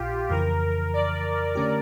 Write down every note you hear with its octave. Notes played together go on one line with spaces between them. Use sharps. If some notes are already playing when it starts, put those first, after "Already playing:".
Already playing: A#1 A#2 F4 G4
F2 C#3 E3 A#4
D5
D3 A3 C#4 G4